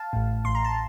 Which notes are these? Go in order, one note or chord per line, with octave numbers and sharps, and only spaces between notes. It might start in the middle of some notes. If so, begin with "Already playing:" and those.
Already playing: F5 A5
A1 A2
A1 A2 C6
A#5
A5